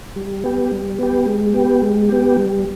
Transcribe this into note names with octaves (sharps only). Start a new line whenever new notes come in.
G3
B3 G4
G3
B3 G4
G#3
B3 G4
G#3
B3 G4
G3